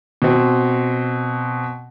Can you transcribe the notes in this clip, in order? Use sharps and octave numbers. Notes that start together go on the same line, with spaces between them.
B2 C4